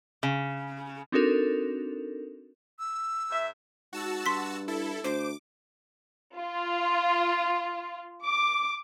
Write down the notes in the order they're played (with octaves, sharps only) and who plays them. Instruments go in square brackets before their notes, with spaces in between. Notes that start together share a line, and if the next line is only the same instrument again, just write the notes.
[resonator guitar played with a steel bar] C#3
[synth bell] C4 D4 D#4 F#4 A4 A#4
[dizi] E6
[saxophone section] G#2 E5
[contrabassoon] G#2 [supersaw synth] F#4 A5 E6
[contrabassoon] G2 [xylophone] C6 B6
[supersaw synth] E4 A4
[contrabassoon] D2 [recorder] C5 [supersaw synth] D6
[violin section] F4
D6